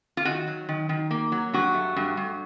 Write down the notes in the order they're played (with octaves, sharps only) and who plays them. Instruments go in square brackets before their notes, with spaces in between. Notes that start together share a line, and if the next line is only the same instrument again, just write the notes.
[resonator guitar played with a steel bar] F4
D#3 F#4
F#3
D#3
D#3
A#3
F#3
G2 F#4
A3
G2
G2